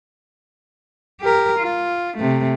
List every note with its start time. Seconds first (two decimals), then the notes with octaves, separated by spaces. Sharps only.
1.21 G4 A#4
1.59 F4
2.18 C3 A3